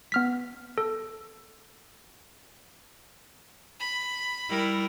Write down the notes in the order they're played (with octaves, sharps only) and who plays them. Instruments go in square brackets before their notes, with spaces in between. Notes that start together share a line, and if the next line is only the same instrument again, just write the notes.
[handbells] B3 F6 B6
A4
[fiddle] B5
[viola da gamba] G3 E4 A#4